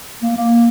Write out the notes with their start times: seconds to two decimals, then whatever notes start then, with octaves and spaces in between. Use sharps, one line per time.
0.23 A#3
0.36 A#3